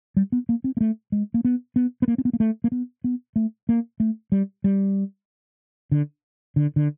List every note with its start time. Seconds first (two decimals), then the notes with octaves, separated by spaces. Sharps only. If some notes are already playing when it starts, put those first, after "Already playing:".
0.16 G3
0.32 B3
0.49 A#3
0.64 C4
0.77 A#3
0.81 A3
1.12 G#3
1.34 A#3
1.45 B3
1.76 B3
2.02 B3
2.08 A#3
2.18 C4
2.25 B3
2.33 A#3
2.40 A3
2.64 A#3
2.72 B3
3.04 B3
3.36 A3
3.69 A#3
4.00 A3
4.32 G3
4.64 G3
5.91 D3
6.56 D3
6.76 D3